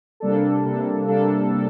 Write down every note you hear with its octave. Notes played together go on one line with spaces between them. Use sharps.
C3 G3 A#3 D4 A4
C3 G3 A#3 D4 A4
C3 G3 A#3 D4 A4
A#3 D4 A4